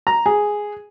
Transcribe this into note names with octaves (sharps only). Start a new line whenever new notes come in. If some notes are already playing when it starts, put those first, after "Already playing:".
A#5
G#4